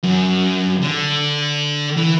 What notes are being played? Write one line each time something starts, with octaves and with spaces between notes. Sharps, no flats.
F#2
D3
E3